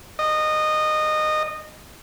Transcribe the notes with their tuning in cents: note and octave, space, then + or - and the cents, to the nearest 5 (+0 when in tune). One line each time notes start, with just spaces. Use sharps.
D#5 -20